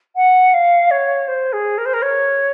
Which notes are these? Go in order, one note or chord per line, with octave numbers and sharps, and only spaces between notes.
F#5
F5
C#5
C5
G#4
A#4
C5
A#4
C#5